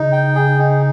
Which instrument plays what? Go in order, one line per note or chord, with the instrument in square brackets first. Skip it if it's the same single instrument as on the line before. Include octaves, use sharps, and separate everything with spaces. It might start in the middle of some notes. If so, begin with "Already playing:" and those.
Already playing: [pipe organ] C#3 [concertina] D#4
[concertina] G5
G#4
D#4